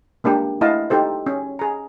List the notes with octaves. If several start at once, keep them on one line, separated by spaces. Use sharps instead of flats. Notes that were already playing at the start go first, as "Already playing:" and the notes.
G#3 A#3 D4 G4
A3 E4 D#5 F5 F#5 A5
D#4 G4 A4 C5
C#4
G#4 A#5